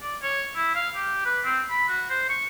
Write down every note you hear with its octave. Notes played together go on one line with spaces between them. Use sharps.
D5
C#5
E4
F5
G4
B4
C4
B5
F#4
C5
C#6